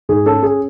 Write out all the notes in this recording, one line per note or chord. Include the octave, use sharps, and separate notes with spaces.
G#2 G#4
C#4 A4
C#4 G#4